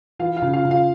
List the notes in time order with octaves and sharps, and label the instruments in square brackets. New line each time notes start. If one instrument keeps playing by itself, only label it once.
[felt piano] E3 [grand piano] F4 F5
[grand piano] F4 F5
[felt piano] C#3
[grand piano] F4 F5
[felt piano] C#3
[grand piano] F4 F5